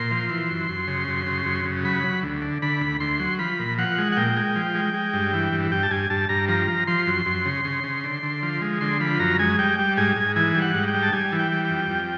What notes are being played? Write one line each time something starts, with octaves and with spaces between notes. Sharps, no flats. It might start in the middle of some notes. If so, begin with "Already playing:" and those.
Already playing: A#2 C6
F3
E3
F#2
F#2
C#3
F#2
C#3
F#2
C#3
F#3 B5
F#3
D2
D3
D3 B5
D2
D2 C6
F#3
F3 B5
A#2
F3 F#5
G#3
F#5
A#2 G5
G#3
F3
G#3
G#3
G2
E3
G2
G2 G5
A5
G2 G#5
G2 A5
G2 A#5
F3 A#5
F3
F3 C6
F#2
F#2
C#3
C#3
C#3
D3
D3
F3
G#3
D3 C6
F3 B5
F#2 A#5
G#3 G#5
G3 G5
G3
G#2 G#5
G#2
E3 G#5
G3
F#5
G#2
G5
G3
A5
G3 G#5
E3
G5
G3
G5
F2
F2